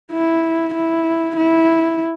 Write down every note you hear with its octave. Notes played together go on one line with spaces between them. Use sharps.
E4
E4
E4